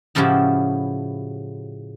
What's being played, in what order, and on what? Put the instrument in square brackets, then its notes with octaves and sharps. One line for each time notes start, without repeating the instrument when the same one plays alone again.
[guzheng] A2 C#3 F3 E4 F#4 G4